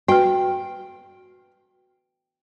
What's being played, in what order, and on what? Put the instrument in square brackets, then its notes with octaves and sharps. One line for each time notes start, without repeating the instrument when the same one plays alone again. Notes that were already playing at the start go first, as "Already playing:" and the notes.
[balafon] F#4 B4 [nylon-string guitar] G5